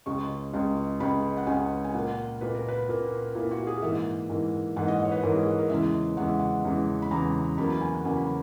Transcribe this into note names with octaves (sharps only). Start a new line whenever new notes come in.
C#2 C#3 G#3 C#6
C#2 C#3 G#3
C#2 C#3 G#3 B5
F#5
C#2 C#3 G#3 G#5
G#5
A#2 A#3 F#5
A#2 A#3 B4
A#4
B4
A#2 A#3
A#2 A#3 E4
F#4
G#4
G#2 E3 A#3 E5
G#2 E3 A#3
G#2 E3 A#3 F#5
D#5
C#5
B4
G#2 E3 A#3 A#4
G#4
A#4
E2 C#3 E3 G#3 E5
E2 C#3 E3 G#3 F#5
E5
F#5
E2 C#3 E3 G#3
B5
E2 C#3 E3 G#3 A#5
E2 C#3 F#3 A#3 B5
B5
G#5
F#5
E2 C#3 F#3 A#3 G#5
B5